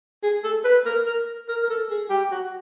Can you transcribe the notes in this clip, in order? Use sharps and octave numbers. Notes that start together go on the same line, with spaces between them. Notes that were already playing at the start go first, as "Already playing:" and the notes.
G#4
A4
B4
A#4
A#4
A#4
A#4
A4
G#4
G4
F#4